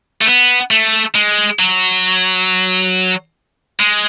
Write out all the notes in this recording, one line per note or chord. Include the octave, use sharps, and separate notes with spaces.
A3
B3
A3
G#3
F#3
G#3